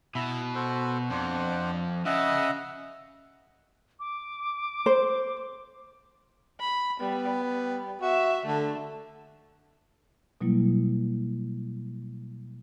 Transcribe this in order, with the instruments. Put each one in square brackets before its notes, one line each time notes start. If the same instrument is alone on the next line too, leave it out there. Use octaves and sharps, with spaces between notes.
[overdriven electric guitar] B2 [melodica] E4 E5
[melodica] F#4 A4 C5
[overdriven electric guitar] F2 [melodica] D4 C5 F#5
[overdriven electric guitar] C#3 [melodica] D#5 E5 F#5
[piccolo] D6
[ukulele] C5
[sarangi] B5
[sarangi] G3 [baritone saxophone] B3
[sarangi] G3
[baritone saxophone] F#4 [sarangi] E5
[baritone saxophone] D3 [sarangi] A3
[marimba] B2 F#3 G3 A#3 E4